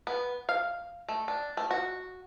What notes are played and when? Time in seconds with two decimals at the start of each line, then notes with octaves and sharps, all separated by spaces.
0.07 B3
0.49 F5
1.08 A3
1.28 D4
1.57 A3
1.71 F#4